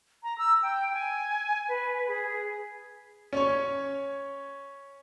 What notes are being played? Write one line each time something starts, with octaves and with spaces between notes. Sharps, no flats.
A#5
E6
G5
G#5
B4
G#4
C#4 C#5